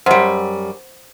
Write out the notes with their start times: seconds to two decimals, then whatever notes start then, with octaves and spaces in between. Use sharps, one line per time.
0.06 F#2 G3 C5 F#5 C6